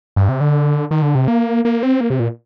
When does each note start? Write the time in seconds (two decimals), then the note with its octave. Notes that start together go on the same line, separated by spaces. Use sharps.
0.16 G2
0.29 C3
0.41 D3
0.91 D#3
1.02 D3
1.15 C3
1.28 A#3
1.65 A#3
1.83 C4
2.01 A#3
2.10 C3
2.20 A#2